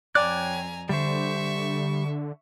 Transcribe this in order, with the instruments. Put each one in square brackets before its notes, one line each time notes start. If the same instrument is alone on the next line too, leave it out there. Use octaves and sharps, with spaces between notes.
[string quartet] F2 G#5 A#5 [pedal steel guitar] C#5 G5 F#6 [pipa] D5
[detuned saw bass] D3 [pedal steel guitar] G3 C5 [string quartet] E5 C#6